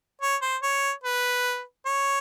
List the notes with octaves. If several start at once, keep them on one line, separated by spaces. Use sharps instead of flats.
C#5
C5
C#5
B4
C#5